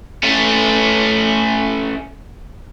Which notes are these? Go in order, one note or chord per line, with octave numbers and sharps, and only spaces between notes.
A3 C#4